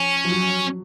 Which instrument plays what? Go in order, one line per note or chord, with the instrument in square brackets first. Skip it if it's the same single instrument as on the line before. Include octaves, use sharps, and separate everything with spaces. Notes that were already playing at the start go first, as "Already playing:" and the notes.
Already playing: [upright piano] F3 [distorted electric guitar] C#4
[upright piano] F3
F#3